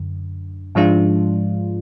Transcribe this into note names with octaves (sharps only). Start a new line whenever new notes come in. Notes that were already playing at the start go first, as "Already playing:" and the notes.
Already playing: F#2 D3
G#2 F3 G#3 D4 F4